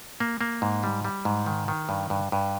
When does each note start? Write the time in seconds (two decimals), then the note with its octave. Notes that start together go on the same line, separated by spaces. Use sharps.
0.20 A#3
0.41 A#3
0.62 G#2
0.83 G3
1.04 G3
1.25 G#2
1.46 D#3
1.68 D#3
1.89 G2
2.10 G2
2.32 G2